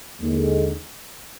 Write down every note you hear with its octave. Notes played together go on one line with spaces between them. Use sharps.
D#2 D3 G#3